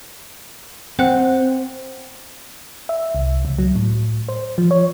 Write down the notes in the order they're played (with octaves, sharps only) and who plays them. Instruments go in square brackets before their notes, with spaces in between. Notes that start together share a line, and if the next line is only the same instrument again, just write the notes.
[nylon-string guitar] C4 [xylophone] C5 F#5 F#6
[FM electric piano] E5
C2
C#2
F#3
A2
C5
F3
C#5